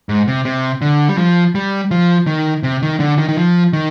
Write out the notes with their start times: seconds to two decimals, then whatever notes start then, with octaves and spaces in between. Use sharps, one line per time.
0.09 G#2
0.27 C3
0.45 C3
0.81 D3
1.09 G3
1.18 F3
1.55 G3
1.91 F3
2.27 D#3
2.63 C3
2.82 D#3
3.00 D3
3.18 D#3
3.29 D#3
3.37 F3
3.73 D#3